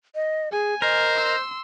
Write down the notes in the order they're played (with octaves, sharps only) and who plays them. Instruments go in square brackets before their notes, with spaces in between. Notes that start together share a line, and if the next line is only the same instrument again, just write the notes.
[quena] D#5
[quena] G#4 [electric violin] G#5
[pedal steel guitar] A#4 [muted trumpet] C5 [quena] D#5
[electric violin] C6 E6